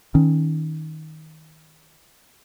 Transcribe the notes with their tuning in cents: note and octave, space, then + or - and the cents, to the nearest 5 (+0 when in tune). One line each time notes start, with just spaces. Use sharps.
D#3 +15 C#4 +0